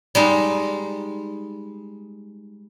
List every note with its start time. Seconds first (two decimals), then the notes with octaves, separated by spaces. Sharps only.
0.15 G3 G#3 D#4